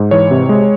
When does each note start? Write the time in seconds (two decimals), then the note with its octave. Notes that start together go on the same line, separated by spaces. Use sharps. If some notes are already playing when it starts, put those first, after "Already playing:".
Already playing: G#2
0.11 E3 C#5
0.31 C3
0.49 G#3